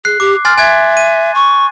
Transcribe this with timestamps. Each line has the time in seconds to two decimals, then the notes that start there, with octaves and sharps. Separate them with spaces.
0.05 G#4 F#6 C7
0.20 G4 D6
0.45 G#5 C6 F6 A6
0.58 E5 G#5 F#6 G#6
0.97 D#7
1.35 C#6